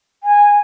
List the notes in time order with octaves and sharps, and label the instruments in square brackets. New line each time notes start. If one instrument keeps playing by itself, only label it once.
[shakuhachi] G#5